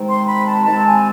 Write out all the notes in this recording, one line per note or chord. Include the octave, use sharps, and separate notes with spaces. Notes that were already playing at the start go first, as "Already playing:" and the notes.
Already playing: C3 D#3 G#3 C4
C6
B5
A5
C3 D#3 G#3 C4 A5
G#5